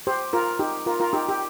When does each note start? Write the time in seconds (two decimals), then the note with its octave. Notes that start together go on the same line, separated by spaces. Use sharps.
0.07 G4 C5
0.33 F4 A#4
0.59 D#4 G4
0.86 F4 A#4
1.00 F4 A#4
1.13 D#4 G4
1.29 G4